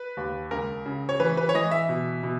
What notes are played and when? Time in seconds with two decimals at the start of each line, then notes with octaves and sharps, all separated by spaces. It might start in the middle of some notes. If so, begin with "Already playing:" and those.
Already playing: B4
0.17 D#2
0.51 C#2 A#4
0.86 C#3
1.09 C#5
1.20 E3 B4
1.37 B4
1.49 C#5
1.55 E3 D#5
1.71 E5
1.89 B2
2.23 B2